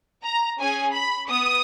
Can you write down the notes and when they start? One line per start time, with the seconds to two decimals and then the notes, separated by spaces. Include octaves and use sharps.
0.24 A#5
0.59 C#4 G#4 G#5
0.95 B5
1.30 B3 D#6